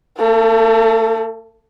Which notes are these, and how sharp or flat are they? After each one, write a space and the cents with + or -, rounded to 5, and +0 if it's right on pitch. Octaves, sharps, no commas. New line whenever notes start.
A3 +45 A4 +0